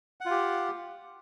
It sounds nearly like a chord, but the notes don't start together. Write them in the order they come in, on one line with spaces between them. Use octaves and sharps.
F#5 F4 G4